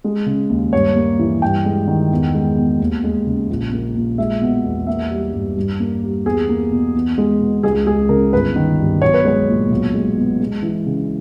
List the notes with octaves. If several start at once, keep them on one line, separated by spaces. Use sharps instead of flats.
G#3
C#3
D#2
G2 C#5
A#3
E3
G2 G5
G#3
D#3
E2
G#3
B2
D#2
G#3
C#3
A#1
A#3
A#2
G#3 E5
B2
E2
A#3 E5
G3
G2
G2
A#3
G3
E2 G#4
A#3
B2
E2
G#3
B2
C#2 G#4
G#3 G#4
C#3 A#4
G1 B4
D#3
G2
B1 C#5
B4
G#3 C#5
A#2
B1
G#3
B2
G#3
E3
C#3